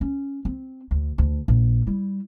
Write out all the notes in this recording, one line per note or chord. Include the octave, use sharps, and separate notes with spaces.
C#4
C4
D2
D2
A#1
G3 E4